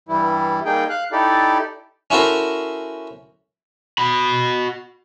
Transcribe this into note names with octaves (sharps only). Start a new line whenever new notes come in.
G2 E3 G3 E4
G3 A#3 D#4 G#4 G5
F5 F#6
D#4 E4 G4 A4 D5
C#4 E4 F#4 A4 A#4 C5
F#4 B5